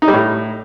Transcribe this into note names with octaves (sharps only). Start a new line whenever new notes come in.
D#4
G3
A2